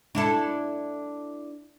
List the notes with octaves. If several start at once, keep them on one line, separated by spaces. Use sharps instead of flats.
D4 E4 A4